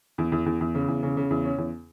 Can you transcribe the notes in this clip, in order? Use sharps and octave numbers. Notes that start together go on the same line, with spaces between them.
E2
E2
E2
E2
C#3
E2
C#3
C#3
E2
C#4
E2